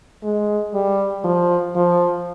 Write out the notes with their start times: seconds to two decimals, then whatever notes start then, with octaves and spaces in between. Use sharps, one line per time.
0.23 G#3
0.74 G3
1.24 F3
1.75 F3